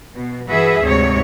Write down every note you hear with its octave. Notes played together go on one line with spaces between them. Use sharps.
B2
G2 E3 F#4 G#4 B4 E5
D2 G#2 C3 C#5